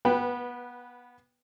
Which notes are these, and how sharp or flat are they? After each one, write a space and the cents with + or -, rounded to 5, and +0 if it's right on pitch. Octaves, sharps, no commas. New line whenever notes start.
B3 -20 B4 +0 G5 +0